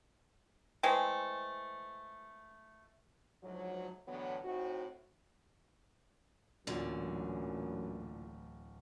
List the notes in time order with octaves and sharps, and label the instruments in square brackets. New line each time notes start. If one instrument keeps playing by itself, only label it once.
[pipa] E3 G#3 A3 C4
[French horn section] D2 G#2 F3 F#3
A2 D3 E3 F#3 B3
A2 C4 D#4 F#4
[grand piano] D1 [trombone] F#2 [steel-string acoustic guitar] A#2 D3 [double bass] E3 A3